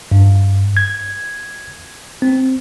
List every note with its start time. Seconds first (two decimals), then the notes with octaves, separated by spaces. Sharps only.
0.12 G2
0.77 G#6
2.22 C4